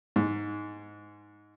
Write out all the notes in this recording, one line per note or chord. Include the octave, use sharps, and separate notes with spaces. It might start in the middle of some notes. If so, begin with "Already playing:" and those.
G#2